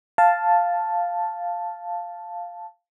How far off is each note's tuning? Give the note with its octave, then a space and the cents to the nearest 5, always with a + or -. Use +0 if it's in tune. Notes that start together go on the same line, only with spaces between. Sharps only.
F5 +0 A5 +0